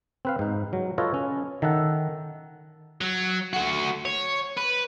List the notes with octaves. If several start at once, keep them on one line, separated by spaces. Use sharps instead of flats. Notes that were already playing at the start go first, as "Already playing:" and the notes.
C4 B4 F5
G#2 D#4
F#3
F4 A4 B4 C#5 D#5
C#4
D#3 D#4 A4 E5 F#5
F#3
A3 F#4
C#5
B4